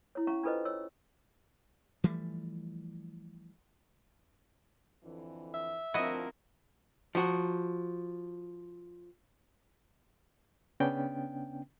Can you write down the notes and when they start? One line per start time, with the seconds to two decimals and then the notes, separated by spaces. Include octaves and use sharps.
0.15 E4 C#5
0.27 C#4 F5 A#5 C#6
0.43 D4 F4 A4 B4 C5 D#5
0.65 C#5 E6
2.04 E3 F3 G3 A3
5.03 F2 D3 E3
5.54 E5
5.94 D2 G2 F3 C4 E4 F#4 A#4 D#5
7.15 F3 F#4
10.80 C#3 B3 C#4 D4 G5